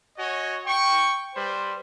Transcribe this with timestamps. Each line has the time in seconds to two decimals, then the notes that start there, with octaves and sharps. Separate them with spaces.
0.18 F#4 C#5 D#5 G#5
0.66 G5 C#6
1.35 G3 B4 C5